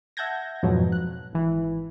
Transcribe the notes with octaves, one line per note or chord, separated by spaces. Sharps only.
E5 F#5 A5 G6 G#6 A#6
F2 G#2 B2 F3 F#3
F#6
G#1 E3